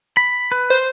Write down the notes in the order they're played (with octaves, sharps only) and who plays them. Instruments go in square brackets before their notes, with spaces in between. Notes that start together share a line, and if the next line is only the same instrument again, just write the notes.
[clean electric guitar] B5
B4
[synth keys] C5